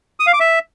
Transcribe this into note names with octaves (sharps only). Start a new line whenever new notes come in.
D#6
F5
D6
E5